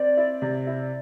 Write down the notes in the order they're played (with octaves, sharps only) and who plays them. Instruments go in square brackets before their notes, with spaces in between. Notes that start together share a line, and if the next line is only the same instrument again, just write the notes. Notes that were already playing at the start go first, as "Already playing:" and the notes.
Already playing: [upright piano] C4 [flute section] D5
[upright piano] E4
C3
E4